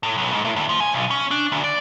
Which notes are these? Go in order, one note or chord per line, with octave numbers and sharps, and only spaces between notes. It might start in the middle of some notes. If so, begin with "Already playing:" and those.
A2
B1
G#2
A2
D2
F3
G#5
B1
C#4
D4
D2
D5